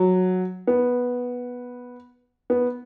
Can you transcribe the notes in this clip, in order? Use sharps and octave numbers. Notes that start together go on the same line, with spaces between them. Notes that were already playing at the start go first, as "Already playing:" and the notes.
Already playing: F#3
B3
B3